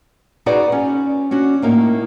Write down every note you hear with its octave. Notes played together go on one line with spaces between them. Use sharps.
D#4 F#4 G#4 B4 D5 F#5
C#4
C#4 D4 F#4
A2 A#3 D#4